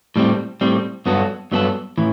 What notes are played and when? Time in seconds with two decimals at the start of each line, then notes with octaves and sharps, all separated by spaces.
0.16 A2 G3 C4
0.61 A2 G3 C4
1.06 G2 F#3 B3 F#4 A4
1.52 G2 F#3 B3 F#4 A4
1.98 A2 E3